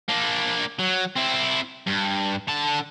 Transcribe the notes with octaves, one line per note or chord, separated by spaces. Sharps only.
A#3 D4
F#3
C4 E4
G2
D3 A5